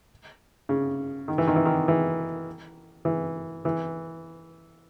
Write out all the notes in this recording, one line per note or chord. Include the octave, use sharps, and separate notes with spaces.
C#3
D#3
E3
D#3
E3
D#3
E3
E3
E3